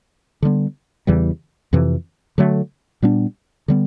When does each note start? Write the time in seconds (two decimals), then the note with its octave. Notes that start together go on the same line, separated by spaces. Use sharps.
0.42 D3 G3 B3
1.07 E2 C#3 E3 G3
1.73 F2 C3 E3
2.38 D3 F#3 A3
3.02 A#2 G3 B3 D4
3.68 D3 G3 B3